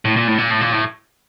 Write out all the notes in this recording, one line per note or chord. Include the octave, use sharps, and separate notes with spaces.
A2
A#2
A2
A#2
A2
A#2
A2